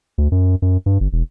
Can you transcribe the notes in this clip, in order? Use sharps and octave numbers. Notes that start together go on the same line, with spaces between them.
D2
F#2
F#2
G2
G1
E1